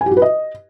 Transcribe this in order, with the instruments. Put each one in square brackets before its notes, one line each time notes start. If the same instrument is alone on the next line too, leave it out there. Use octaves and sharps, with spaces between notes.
[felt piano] G#5
G4
F#4
B4
D#5